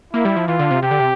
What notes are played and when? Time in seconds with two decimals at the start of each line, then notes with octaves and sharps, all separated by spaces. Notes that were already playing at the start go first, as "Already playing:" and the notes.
0.13 A#3 E4
0.25 G3
0.36 F3
0.48 E3 F4
0.59 D3
0.71 C3
0.82 C3 G4
0.91 D3
1.00 C3